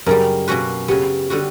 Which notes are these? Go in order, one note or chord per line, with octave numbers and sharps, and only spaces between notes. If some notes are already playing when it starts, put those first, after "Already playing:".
F#2 C#3 G3 A#4
B2 A#3 C#4 F#4 B4
C#3 F#3 B3 G4
D3 G3 B3 F#4